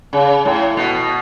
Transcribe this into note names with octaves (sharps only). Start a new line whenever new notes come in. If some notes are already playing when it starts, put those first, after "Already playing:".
C#3
A2
B2